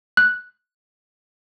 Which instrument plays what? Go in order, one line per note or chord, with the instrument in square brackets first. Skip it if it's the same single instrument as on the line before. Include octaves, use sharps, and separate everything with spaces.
[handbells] F#6